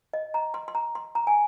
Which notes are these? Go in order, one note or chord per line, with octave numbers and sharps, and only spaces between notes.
D#5
A#5
C6
C6
A#5
C6
A#5
G#5